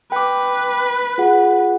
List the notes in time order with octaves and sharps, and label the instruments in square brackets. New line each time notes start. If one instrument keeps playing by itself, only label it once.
[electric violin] B4 [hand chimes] G5 D6
[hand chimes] F4 G#4 F#5